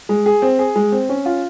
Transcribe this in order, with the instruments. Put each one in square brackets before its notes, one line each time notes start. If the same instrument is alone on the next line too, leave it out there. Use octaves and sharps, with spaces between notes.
[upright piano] G#3
G#4
C4
G#4
G#3
C4
C#4
F4